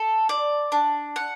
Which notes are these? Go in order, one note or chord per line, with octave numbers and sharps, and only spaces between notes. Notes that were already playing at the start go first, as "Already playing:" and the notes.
Already playing: A4
D5
D4
F#5